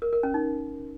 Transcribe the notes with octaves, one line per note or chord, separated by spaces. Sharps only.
A#4
A#4
C#4
D#4